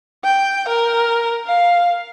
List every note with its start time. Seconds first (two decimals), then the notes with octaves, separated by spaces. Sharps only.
0.24 G5
0.68 A#4
1.45 F5